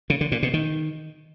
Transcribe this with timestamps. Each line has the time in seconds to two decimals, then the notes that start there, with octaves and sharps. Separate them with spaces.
0.10 C#3
0.21 D3
0.32 A#2
0.43 B2
0.54 D#3